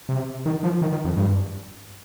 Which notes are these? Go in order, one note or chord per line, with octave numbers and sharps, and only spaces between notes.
C3
D#3
F3
D#3
D#3
F2
G2